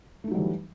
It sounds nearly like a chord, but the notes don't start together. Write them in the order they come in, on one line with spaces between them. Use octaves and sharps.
A3 D#4 F#3 G3 E3